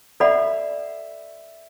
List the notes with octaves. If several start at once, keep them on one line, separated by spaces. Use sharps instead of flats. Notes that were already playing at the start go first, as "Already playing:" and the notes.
A4 D5 E5 F#5 B5